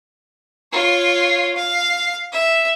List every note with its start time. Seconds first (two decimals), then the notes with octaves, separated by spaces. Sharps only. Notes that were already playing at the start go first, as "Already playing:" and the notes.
0.72 F4 C#5
1.56 F5
2.33 E5